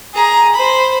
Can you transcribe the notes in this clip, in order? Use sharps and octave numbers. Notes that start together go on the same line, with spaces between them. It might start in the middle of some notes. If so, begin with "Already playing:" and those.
G#4 A#5
C5 B5